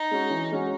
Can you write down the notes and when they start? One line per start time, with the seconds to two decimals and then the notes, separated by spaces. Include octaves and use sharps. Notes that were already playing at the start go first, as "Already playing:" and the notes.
Already playing: D#4
0.11 G#3 C#4 F#4
0.30 E3
0.52 G#3 C#4 F#4